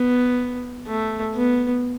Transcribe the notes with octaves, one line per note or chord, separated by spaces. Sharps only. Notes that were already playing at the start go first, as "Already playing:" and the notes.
Already playing: B3
A3
B3